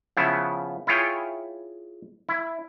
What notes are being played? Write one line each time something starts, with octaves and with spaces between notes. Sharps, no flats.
C#3 F3 B3 E4 E5
E4 F4 G#4 C#5 G5
E4